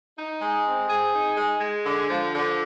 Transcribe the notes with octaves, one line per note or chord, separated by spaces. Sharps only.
D#4
G#3
C4
G#4
D#4
G#3
G#3
D3
F3
D3